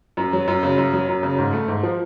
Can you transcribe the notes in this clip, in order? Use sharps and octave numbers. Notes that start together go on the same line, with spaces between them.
F#2
F#3
F#2
C#3
F#2
F#3
F#2
C#3
G#2
A3
G#2
F3